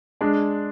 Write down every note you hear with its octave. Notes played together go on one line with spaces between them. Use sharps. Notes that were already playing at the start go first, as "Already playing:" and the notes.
G#3 D4